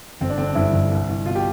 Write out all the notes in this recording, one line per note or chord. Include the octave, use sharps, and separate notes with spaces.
G1 C4
D4
D3 C4
D4
G2 C4 E4
G1
C2
C2
B2 F4
G4